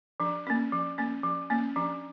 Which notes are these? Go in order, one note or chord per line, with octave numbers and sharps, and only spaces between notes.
F3 D4
A#3 C#4
F3
A#3 C#4
F3
A#3 C#4
F3 D4